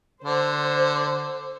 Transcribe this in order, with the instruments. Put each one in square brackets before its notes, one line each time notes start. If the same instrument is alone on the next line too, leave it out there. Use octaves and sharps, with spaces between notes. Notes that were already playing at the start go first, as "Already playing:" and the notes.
[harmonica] D3 [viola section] C5